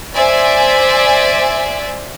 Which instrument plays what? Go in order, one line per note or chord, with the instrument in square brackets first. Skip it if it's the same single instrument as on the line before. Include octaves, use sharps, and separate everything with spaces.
[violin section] C5 D5 E5 G#5